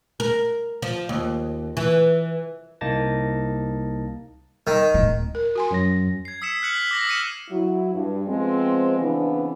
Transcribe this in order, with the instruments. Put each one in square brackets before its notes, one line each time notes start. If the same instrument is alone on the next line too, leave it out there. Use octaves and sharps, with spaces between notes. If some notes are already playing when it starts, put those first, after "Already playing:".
[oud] A#4
F3
D#2
E3
[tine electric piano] C2 A#3 D#4 A5 A6 A#6
[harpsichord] D#3
[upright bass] D1 G#3
[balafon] A#4
F#4 G#5 C6
[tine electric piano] F#2 F#3 A#6
[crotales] G#6 C7
D#6 E6 B6 C#7 E7
F6 F#6 B6 C#7 F#7
B6
D6 A#6 F#7
D#6 F6 C7 C#7 D#7 E7
[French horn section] F#3 E4
G2
F3 G#3 B3 C4
C#3 E3 B3 C4 D4